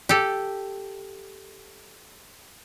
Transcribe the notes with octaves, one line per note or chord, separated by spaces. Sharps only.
G4 A4